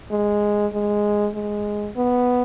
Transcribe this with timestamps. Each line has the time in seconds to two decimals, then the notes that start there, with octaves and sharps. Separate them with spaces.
0.11 G#3
0.73 G#3
1.35 G#3
1.96 B3